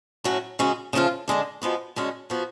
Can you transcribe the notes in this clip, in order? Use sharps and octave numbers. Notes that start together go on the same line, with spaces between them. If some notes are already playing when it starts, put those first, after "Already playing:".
A2 F#3 C#4 F#4
C#3 G#3 C#4 F#4
C#3 F3 A3 F4
D3 G#3 D4
F3 G#3 B3 F#4
D3 G#3 C#4 F#4
F3 B3 F#4